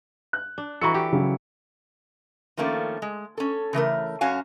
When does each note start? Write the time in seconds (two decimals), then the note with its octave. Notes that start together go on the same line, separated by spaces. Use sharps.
0.33 F#6
0.58 D4
0.81 E3 F#4 A4 A#5 C#6 C#7
0.94 G4
1.12 C#3 F#3
2.57 D#3 F3 A3 A#3 C#4
3.02 G#3
3.38 C#4 A4
3.73 C#3 E3 A3 A#4
4.21 F#2 C#4 F#4 F5 G#5